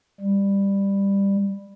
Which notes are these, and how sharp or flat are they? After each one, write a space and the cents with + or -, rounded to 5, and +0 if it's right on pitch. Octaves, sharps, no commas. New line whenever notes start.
G3 +15